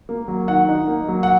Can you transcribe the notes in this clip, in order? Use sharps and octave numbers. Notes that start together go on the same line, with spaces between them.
A#3
F#3
D#3 F#5
D#4
A#3
F#3
F#5